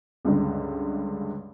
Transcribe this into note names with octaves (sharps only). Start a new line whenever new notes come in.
C#2 G2 D3 G#3